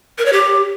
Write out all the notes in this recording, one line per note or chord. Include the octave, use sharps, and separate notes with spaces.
A#4
C#5
G4